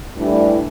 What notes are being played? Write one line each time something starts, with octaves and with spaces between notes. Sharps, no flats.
A2 E3 G3 D4 G4